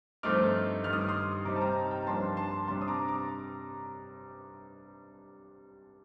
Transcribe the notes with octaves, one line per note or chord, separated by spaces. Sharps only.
G2 F3 A3 C4 D#4 D6 F6
G2 D#3 G3 F6
D#6
D6
C6 D#6
C3 G3 C4 D#4 A#5 D6
A5
G5 A#5
G5 A#5
G2 F3 A#3 D4 A5 C6
A5 C6
C3 G3 D4 A5 C6
D#6
A#5 D6
A#5 D6